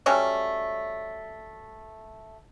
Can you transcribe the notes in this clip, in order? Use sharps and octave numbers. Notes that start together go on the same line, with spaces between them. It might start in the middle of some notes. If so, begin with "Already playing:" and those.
F#3 G3 A3 C#4